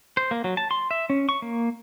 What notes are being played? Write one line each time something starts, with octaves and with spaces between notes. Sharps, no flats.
C5
A#3
F#3
A5
C6
E5
C#4
C#6
A#3